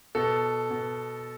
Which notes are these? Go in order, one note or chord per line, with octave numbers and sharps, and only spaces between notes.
B2 A4
B2